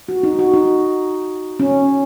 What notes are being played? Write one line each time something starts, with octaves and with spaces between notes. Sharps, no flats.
F#4
D#4
F#4
D#4
C#4